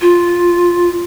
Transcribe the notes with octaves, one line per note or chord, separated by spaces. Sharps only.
F4